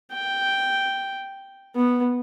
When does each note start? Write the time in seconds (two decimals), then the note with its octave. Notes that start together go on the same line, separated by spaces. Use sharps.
0.12 G5
1.75 B3